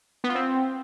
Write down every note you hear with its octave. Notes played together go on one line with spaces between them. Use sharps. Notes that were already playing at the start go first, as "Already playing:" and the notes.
B3
F4
C4